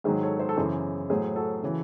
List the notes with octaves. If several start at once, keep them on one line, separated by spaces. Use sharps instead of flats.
G#2 D#3 F#3 G#4 C5
A4 C#5
C5
A4
F#2 C#3 E3 G#4 C5
A2 F#3 G#4 C5
F#4 A4
C#3 E3